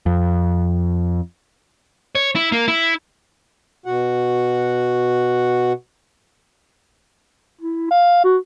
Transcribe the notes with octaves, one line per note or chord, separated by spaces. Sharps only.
F2
C#5
E4
A#3
E4
B2 F#4 F#5
E4
F5
F#4